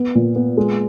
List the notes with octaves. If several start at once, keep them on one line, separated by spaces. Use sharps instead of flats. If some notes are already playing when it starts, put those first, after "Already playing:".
Already playing: B3
A#2
B3
G#3